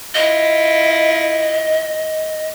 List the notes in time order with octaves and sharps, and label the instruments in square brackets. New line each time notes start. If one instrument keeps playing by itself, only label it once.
[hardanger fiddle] E4 F4 [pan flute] D#5